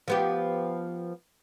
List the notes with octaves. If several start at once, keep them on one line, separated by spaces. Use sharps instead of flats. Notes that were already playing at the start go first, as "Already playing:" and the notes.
F3 B3 G4